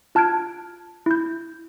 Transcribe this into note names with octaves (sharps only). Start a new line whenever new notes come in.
F4 A5 F6 F#6 G#6 D7
E4 G6